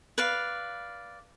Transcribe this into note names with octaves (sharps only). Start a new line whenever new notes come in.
B4 D5 F5